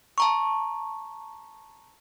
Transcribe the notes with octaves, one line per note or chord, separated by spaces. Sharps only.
A5 A#5 C#6